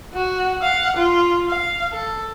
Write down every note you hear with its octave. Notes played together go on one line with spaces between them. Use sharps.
F#4
F5 F#5
F4
F5
A4